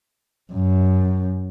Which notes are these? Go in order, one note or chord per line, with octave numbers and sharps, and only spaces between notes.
F#2